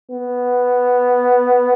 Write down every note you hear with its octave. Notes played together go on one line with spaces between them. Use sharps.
B3